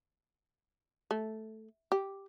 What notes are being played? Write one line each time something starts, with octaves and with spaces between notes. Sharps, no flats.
A3
G4